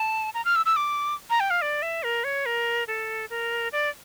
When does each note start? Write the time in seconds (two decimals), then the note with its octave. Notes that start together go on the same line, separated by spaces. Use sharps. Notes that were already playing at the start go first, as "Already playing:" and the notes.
Already playing: A5
0.34 A#5
0.45 F6
0.56 E6
0.66 E6
0.76 D6
1.30 A#5
1.40 G5
1.50 F5
1.62 D5
1.82 E5
2.03 A#4
2.24 C#5
2.46 A#4
2.88 A4
3.30 A#4
3.72 D5